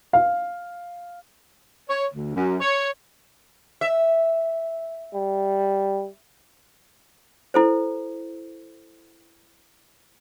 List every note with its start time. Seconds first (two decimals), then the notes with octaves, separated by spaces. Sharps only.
0.13 F5
1.89 C#5
2.13 D2
2.35 F#2
2.61 C#5
3.81 E5
5.14 G3
7.54 E4 A4 C5